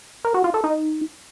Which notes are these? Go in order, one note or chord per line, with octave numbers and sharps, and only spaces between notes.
A#4
F#4
F4
A4
D#4